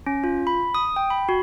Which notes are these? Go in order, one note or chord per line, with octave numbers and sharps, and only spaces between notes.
C#4
F4
B5
D#6
G5
B5
F#4